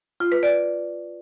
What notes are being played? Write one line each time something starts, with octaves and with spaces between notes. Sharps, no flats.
F4
B4
D5